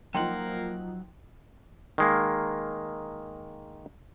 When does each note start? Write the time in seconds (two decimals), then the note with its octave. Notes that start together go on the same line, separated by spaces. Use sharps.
0.14 F3 F#3 A#3 D#4 F#5 G5 C6
1.98 D#3 G#3 A#3